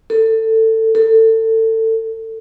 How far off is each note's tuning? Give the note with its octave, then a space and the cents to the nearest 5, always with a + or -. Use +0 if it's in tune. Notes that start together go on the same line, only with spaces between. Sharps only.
A4 +20
A4 +25